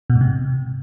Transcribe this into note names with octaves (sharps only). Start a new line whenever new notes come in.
B2
G#2
C3